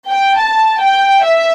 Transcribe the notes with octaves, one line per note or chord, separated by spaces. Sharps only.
G5
A5
G5
E5